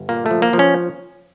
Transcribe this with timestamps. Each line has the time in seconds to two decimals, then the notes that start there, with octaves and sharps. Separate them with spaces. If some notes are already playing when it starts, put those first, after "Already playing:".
Already playing: G1
0.09 A#2 A#3
0.26 A3
0.31 F3
0.42 A#3
0.53 F3
0.59 C#4